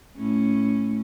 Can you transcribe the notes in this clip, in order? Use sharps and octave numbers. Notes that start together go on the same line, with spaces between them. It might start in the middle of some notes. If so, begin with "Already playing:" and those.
A2 A3 C#4